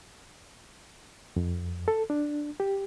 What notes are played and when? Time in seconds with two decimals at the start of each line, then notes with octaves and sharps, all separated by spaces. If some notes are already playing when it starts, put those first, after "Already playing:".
1.36 F2
1.88 A4
2.10 D4
2.60 G4